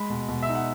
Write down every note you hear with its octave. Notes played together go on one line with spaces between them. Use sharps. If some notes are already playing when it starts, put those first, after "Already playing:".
Already playing: G#3 B5
B2
B2
E5
D#4
F#5